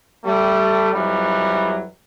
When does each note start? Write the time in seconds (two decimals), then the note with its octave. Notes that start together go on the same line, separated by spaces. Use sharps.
0.24 G3 A3
0.92 F2 E3 F#3 G3